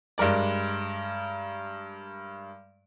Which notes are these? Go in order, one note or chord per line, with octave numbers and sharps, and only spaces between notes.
G2 G#3 A#4 D5